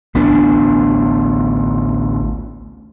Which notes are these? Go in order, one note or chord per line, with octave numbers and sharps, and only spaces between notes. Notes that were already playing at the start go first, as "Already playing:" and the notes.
A1 D2 B3 D4